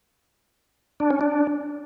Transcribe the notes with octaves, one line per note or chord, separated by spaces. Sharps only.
D4
C#4
D4